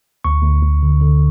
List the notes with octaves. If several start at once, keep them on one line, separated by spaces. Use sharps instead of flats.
D2 C#6
D2
D2
D3
D3